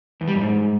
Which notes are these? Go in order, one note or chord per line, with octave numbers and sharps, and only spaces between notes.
E2
G3
F#2
G#2